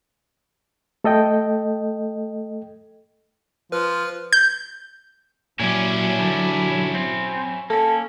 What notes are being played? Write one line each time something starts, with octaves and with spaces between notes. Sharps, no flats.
A3 A4 D#5 G5
F3 B4 F6
G6
A#2 F#3 C#4 E4 G4
D3 G3
C4
A#3 C#4 A4